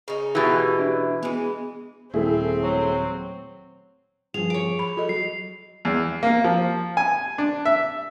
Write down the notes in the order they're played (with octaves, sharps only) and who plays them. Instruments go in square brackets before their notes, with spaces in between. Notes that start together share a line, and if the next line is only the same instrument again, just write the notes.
[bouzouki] C#3 D#4
[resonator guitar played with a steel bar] B2 E3 [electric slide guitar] G4
[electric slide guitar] D4 E5
[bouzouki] E3 G#3 [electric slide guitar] B3
[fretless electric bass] D#1 [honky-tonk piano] A3 E4 G#4 [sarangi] C4
[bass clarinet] F#3
[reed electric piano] G2 F3 [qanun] G#4 [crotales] F7
[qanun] C#5 D6
[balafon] B5
F4 A4 D#5
[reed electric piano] F#3 [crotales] C7
[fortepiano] E2
A#3
F3
G#5
D4
E5